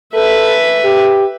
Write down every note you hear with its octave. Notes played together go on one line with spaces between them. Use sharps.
A4 B4 E5
G4